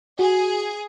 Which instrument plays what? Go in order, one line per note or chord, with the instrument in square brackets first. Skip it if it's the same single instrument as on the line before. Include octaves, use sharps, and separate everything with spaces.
[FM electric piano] F#4 [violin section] G#4